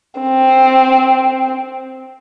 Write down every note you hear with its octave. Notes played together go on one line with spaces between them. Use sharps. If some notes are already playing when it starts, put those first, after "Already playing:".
C4